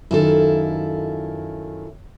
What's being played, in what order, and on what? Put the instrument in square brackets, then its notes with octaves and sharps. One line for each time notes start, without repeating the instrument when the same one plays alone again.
[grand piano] F#2 D#3 [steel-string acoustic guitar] E4 F4 A4